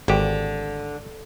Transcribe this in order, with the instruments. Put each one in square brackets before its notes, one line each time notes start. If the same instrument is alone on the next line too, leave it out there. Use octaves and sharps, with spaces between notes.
[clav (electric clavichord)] G#1 G4 [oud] D3